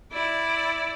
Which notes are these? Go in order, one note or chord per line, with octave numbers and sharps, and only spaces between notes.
E4 D5